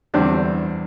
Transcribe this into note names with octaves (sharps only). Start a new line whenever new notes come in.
E2 D3 G3 C4 D4